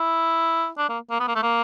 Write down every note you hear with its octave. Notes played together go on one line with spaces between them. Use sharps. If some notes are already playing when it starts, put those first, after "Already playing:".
Already playing: E4
D4
A#3
A#3
B3
A#3
A3
A#3